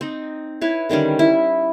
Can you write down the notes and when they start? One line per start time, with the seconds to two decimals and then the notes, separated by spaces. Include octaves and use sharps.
0.01 C4 D#4
0.61 E4 B4 C#5
0.89 D3 D#3 G3 C#4
1.19 E4